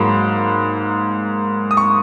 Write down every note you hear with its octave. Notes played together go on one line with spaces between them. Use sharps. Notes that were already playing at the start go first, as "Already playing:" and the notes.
Already playing: G#2 F#3 A#3 B5
D#6
C#6